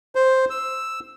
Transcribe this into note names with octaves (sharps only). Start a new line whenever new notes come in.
C5
E6